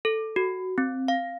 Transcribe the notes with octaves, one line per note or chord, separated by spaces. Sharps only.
A4
F#4
C4
F5